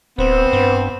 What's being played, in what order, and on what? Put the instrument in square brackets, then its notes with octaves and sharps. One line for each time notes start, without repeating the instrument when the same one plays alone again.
[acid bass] D1 [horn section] B3 C4
[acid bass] G2